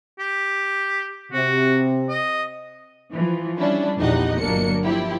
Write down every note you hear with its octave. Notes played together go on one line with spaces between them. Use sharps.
G4
C3 F#4
D#5
E3 F3
G3 C#4 D4 E4
A#1 E2 D#4 G4 D#5 F#5
G1 F#3 A#3 D4 C#7
F3 E4 G4